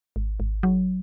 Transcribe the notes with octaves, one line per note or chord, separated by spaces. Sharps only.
G#1
G#1
F#3